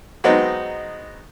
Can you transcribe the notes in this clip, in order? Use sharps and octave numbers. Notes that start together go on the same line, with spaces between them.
F#3 G#3 B3 C4 D#4